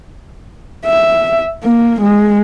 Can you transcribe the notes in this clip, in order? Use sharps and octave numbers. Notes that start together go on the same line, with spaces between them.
E5
A#3
G#3